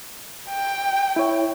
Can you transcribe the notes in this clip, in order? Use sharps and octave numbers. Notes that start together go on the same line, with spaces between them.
G5
E4 C#5